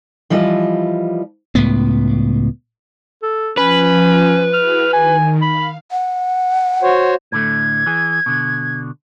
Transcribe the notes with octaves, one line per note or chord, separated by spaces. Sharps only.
E3 F3 G3 E4 F4 D#5
C#2 A2 B3
A4
F3 C#4 B4
E4 F#4 G#4 F6
D#3 G#5
F5 B5
F#5
F#4 C5 C#5
A2 D3 A3 G#6
E3 G#4
B2 D3